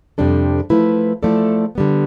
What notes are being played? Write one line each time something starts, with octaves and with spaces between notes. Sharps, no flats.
F2 C3 G3 D4 A4
F3 A3 E4 B4
F3 A3 E4 A4 D5
D3 G3 B3